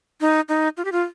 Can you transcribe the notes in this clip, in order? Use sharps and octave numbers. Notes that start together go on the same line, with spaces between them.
D#4
D#4
F4
G4
F4